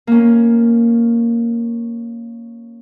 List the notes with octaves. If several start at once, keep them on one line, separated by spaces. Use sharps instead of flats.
A#3 C#4